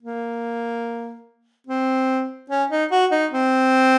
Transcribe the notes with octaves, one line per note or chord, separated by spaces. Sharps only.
A#3
C4
C#4
D#4
F#4
D#4
C4